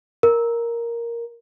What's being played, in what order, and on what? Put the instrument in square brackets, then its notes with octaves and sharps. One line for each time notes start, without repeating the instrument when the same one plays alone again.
[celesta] A#4